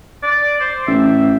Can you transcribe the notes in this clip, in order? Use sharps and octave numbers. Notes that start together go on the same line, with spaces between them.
D5
C5
A1 E5